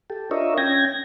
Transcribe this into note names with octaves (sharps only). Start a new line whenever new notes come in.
G4 A4
D4 F4 A#4 C#5 D#5 E5
C#4 G5 G#6 A#6